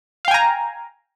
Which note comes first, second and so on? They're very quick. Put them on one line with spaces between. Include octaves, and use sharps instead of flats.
F5 G5 G#5 A#5